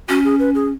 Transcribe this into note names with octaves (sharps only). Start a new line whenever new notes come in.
C#4 F#4
G#4
B4
G#4